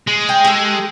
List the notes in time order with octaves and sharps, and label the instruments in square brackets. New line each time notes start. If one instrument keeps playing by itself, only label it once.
[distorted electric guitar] G#3
[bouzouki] G5
G4 A4